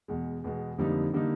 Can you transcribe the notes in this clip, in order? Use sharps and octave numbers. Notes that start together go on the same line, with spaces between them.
E2 B2 G#3
E2 B2 G#3
F2 D3 G3 A#3 D#4
D3 G3 A#3 D#4